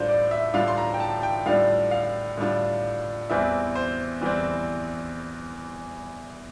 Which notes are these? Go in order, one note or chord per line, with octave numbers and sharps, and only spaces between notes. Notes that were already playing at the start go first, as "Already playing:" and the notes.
Already playing: A2 G3 D4 F4 C5
D5
E5
A2 G3 D4 F4 F5
C6
A#5
G5
A5
G5
A2 G3 D4 F4 F5
F5
A2 G3 D4 F4
E2 E3 G3 C4 E5
C5
E2 E3 G3 C4